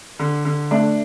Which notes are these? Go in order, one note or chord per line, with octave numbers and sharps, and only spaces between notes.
D3
D3
A3 D4